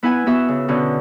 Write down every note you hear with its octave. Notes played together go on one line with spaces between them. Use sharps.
B3 E4 B4 F#5 G#5
B3 F#4 E5 E6
C#3
B2 D3 C#4 F#4